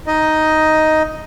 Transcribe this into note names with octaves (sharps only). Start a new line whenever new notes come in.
D#4 D#5